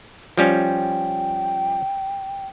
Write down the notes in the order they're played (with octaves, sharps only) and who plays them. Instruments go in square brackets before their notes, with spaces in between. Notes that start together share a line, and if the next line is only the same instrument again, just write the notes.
[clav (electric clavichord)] F3 G3 C#4 [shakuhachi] G5